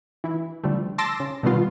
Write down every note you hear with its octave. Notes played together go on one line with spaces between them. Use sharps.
E3 E4
D3 F3 G3 A3
A5 C6 D6 E6 A6 A#6
C#3
B2 D#3 G3 A3 B3 F4